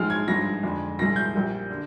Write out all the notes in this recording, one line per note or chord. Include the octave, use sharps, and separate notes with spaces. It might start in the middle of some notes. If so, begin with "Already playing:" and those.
Already playing: A#1 G#2 F3 G#3 F6
G#6
G#1 G2 F3 G#3 A#6
F2 D3 G#3
C2 A#2 F3 G#3 A#6
G6
A#1 A#2 G3
D3